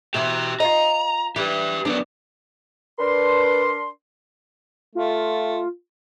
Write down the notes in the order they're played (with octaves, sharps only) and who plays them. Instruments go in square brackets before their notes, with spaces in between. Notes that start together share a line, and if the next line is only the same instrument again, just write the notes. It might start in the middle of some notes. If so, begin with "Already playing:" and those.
[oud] B2 E3 [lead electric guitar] G4 E5
[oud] F4 D#5 [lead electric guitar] A#5
[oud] E3 G3 [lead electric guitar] G4 B4
[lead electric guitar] F#2 B3 [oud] D4
[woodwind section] D4 A#4 C6 [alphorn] B4
[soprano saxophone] A3 [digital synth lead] F4